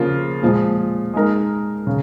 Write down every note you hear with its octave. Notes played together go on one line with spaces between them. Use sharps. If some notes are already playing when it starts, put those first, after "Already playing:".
Already playing: C#3 F3 A#3 F4
A#2 F3 G#3
G#3 D#4 A#4
C#3